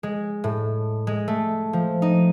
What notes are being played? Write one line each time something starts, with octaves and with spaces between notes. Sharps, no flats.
G#3
A2
G#3
A3
F3
D#4